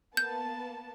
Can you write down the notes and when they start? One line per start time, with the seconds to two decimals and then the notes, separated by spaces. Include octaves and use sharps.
0.17 A#3 B3 A5 G6